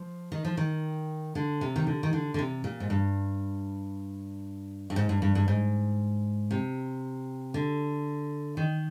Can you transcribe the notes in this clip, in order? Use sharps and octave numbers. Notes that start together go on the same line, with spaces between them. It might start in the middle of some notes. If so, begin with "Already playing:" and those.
Already playing: F3
D#3
F3
D#3
D3
C3
D#3
D3
D#3
D3
D3
C3
A#2
G#2
G2
G2
G#2
G2
G2
G2
G#2
C3
D3
D#3